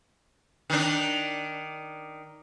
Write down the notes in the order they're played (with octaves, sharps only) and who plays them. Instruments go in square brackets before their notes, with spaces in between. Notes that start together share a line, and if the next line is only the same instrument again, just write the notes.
[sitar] D#3 D4